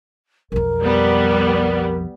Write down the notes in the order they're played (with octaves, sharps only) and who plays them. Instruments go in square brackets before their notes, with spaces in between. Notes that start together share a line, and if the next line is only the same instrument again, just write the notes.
[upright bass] B1 F2 [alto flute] A#4
[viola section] G3 B3